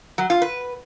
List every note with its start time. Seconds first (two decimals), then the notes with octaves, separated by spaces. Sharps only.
0.18 F#3
0.30 F4
0.42 B4